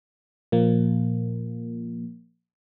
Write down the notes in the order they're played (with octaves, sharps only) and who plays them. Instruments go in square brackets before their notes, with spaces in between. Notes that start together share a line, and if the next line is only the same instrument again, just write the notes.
[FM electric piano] A#2 F3 A#3